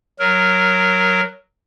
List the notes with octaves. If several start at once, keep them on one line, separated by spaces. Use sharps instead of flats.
F#3 A#4